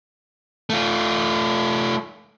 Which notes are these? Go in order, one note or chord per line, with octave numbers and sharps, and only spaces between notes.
A3 F4